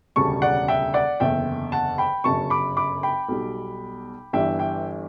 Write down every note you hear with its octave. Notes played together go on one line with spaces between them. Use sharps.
E1 D2 C#3 G3 A5 C#6
D5 F#5
E5 G5
D5 F#5
F#1 E2 D3 E5 G5
F#5 A5
G5 B5
G1 F#2 C#3 A5 C#6
B5 D6
B5 D6
G5 B5
B1 B2 G3
G1 G2 E3 G3 E5 G5
E5 G5